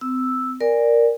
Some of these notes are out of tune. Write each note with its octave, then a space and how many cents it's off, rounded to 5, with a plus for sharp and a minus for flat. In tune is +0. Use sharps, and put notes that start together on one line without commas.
C4 -30 E6 +0
A#4 +0 D5 +0 G#5 -25